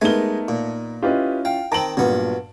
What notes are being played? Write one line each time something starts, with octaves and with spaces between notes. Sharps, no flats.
G#3 A3 B3 D#4 A#4 G#5 G7
A#2
C#4 E4 F4 G4 B4 D#5
F5 G5
D#3 C4 A5 A#5 D7 F#7
G2 A#2 F#3 B3